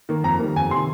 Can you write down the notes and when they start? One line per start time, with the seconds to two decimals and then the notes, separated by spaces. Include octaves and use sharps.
0.09 D#3 A#3
0.24 F2 A#5
0.40 D#3 G3 A#3
0.56 F2 G#5
0.71 C3 D#3 C6